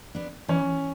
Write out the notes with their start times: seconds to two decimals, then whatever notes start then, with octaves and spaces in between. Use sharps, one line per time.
0.15 B3 D4
0.48 E3 C#4